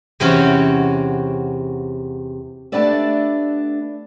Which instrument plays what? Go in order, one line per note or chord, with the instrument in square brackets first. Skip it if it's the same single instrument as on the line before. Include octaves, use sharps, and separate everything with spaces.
[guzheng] E2 C3 C4 C#4 F#4 G5
[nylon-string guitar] A3 B3 D4 G4 D5 E5